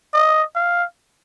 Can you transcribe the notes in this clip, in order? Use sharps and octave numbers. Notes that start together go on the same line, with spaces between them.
D#5
F5